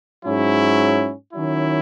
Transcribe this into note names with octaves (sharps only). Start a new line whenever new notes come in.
G#2 F#3 C#4 E4
D#3 F#3 C#4 E4